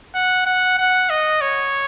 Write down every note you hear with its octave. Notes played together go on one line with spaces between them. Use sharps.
F#5
F#5
F#5
D#5
C#5